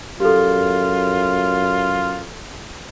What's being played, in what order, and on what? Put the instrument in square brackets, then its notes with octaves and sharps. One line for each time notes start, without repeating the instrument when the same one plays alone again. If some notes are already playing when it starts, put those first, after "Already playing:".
[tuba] F#2 [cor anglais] F4 [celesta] G4 A4